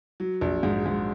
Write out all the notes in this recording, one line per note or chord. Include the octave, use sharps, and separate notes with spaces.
F#3
A#1
G#2
G#2